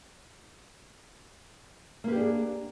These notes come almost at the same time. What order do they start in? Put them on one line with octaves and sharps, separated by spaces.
A#3 B4 G4 D4 G#4